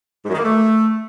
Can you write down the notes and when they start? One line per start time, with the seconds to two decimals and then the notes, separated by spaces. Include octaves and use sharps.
0.23 G#2
0.28 F#2
0.34 D#3
0.39 A#3
0.44 A3